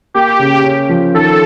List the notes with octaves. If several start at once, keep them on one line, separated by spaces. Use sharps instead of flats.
A#3 G4
C#3
C#4
F3
D#3 A4